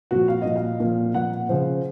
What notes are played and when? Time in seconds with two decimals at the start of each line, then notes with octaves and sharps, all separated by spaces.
0.11 A#2 F3 F#4
0.28 F5
0.42 A#2 F3 D#5
0.56 F5
0.80 A#2 F3
1.14 A#2 F3 F#5
1.49 C#3 F3 C5